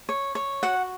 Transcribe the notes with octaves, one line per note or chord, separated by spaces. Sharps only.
C#5
C#5
F#4 F#5